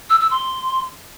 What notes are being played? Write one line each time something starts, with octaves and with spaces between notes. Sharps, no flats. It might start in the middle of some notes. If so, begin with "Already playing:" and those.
E6
E6
C6